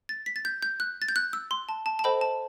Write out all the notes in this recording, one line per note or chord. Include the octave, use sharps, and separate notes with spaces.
A6
B6
A6
G6
G6
F#6
A6
G6
F#6
E6
C6
A5
A5
A5
A4 C5 D#5 G5 B5
A5